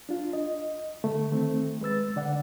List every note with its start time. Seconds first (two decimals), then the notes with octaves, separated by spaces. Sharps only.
0.09 D4 F4
0.33 D#5
1.04 D3 A3
1.31 D#3 A3 C4
1.81 G#3 B4 E6 A6
2.16 D3 D5 F#5